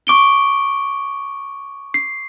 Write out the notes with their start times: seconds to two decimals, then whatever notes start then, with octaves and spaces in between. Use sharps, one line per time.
0.07 C#6 D6 D7 G7
1.94 C7